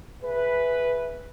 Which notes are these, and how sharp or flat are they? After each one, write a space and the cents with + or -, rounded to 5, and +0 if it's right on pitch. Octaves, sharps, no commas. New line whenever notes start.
G#4 +0 B4 +0 E5 +0